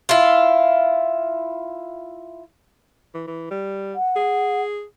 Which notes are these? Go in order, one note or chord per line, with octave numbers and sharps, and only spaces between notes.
E4 F4
E3
E3
G3
F#5
G#4